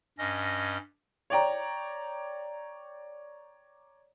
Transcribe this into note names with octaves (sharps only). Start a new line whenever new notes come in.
G2 C#4 D#5 A#6
C#5 D5 G5 A#5